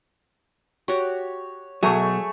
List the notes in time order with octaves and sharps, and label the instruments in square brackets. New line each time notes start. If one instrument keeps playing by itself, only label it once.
[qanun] F#4 G4 [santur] C#5
[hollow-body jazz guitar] B1 F#3 [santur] A3 C#6 [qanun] G#4 E5